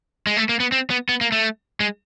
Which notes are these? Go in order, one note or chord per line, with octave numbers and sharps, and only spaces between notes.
G#3
A3
A#3
B3
C4
B3
B3
A#3
A3
G#3